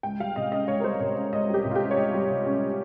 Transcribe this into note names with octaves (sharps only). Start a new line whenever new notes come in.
C#2 G5
G3 F5
C3 D#5
C#4 D#5
C#2 C#5
A#4
G3 C5
C3 C#5
C#4
C#2 D#5
G3 G4
C3
F4
G4
C#4
C#5
C#2 D#5
G3
C3
C#4